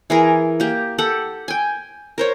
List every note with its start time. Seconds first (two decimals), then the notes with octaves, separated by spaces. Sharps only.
0.10 E3 G#4 A#4
0.60 A#3 G4
0.98 G4 A4 F#5
1.48 G5 G#5
2.18 A#4 C5 C#5